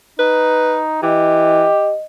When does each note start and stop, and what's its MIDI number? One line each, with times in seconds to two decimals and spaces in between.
0.19 0.99 63
0.19 0.81 71
1.03 1.65 52
1.03 1.95 67
1.03 2.04 75